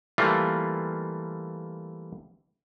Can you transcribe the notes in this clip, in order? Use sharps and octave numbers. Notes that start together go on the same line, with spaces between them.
E3 G3 A3 A#3 F4